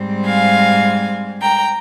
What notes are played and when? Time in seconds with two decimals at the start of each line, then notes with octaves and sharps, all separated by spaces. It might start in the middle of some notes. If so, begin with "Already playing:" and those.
Already playing: G#2 G3 C4
0.27 F5 G#5
1.42 G5 A#5